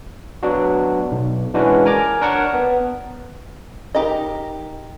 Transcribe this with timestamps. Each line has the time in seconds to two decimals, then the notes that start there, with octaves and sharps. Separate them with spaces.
0.43 F#3 B3 D4 F#4
1.12 B1
1.54 E3 G#3 C#4 D4 F#4 B4
1.85 A#4 G#5 A#5 D6
2.21 D4 A#4 C#5 F#5 A5 C#6
2.54 B3
3.95 D#4 G4 A#4 D#5